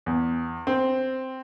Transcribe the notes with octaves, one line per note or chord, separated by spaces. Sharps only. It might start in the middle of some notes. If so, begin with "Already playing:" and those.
E2
C4